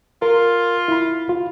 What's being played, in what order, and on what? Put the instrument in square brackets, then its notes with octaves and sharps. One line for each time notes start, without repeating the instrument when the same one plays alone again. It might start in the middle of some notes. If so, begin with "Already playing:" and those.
[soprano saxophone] F4 [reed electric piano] A#4
[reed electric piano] E4 B5
F4